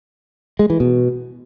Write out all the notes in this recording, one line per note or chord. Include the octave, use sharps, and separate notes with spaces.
G#3
E3
B2